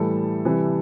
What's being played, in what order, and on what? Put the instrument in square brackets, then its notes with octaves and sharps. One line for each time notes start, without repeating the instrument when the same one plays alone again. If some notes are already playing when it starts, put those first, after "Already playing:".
Already playing: [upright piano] A2 E3 G3 A4
C3 E3 G3